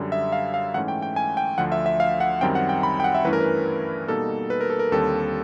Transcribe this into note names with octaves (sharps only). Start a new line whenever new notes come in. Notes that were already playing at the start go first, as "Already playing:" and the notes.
Already playing: F#2 D3 G3
E5
F5
F5
G#2 E3 A3 C#4 F#5
G5
G5
G#5
G5
D2 D3 F3 F#5
E5
E5
F5
F#5
F#2 D#3 G3 C4 G5
F#5
G5
B5
G5
F#5
E5
G2 E3 A3 C#4 E4 B4
A#4
B4
B2 G3 A#3 D#4 A4
B4
A#4
A4
A#4
D#2 D3 G3 C4 A4